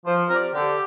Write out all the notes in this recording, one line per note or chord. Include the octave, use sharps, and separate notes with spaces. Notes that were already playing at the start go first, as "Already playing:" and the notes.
F3 C5
C4 G4 A#4 D5
D3 G4